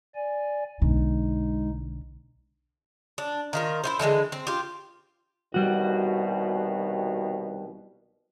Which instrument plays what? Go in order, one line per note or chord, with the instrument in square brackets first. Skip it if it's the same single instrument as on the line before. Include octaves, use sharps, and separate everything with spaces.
[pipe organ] D5 G#5
[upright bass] B1 D3 [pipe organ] G#3 D#4
[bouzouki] D4
D#3 F4 A#4
E4 F4 C5
D3 E3 G3 G#3
C4
F4 G4
[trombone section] C2 B2 D#3 [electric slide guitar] G3 F#4